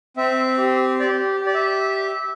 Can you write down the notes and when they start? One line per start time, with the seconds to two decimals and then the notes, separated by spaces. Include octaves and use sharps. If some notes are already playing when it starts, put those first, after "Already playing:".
0.17 C4 E5
0.58 G4
1.00 G4 D5
1.41 G4
1.46 D5
1.54 E5